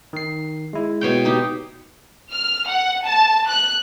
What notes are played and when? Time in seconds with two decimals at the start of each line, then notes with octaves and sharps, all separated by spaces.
0.13 D#3 C7
0.73 G#3 E4
1.01 B2 C#5 G5
1.25 D#4 G4
2.31 F6
2.68 F#5
3.05 A5
3.47 F#6